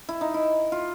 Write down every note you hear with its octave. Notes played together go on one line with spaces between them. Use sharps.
E4
D#4
E4
F4